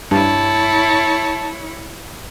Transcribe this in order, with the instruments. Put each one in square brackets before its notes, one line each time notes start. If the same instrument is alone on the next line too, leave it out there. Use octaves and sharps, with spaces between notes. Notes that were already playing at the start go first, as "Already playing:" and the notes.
[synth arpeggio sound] G2 [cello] E4 C#5 [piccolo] A5